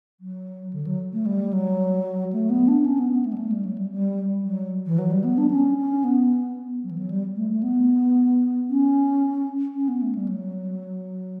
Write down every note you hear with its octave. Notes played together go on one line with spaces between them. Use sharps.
F#3
D3
F#3
A3
G3
F#3
A3
B3
D4
C#4
B3
B3
A3
G3
A3
G3
F#3
G3
G3
F#3
E3
F#3
G3
B3
D4
C#4
C#4
B3
F#3
E3
F#3
G3
A3
A3
B3
C#4
C#4
B3
A3
G3
F#3